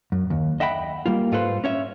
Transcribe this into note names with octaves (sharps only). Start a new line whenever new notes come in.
F#2
D#2
D#5 E5 F#5 G5 B5
G3 A#3 F4
G#2 F4 A4 B4 C5
C#4 C#5 E5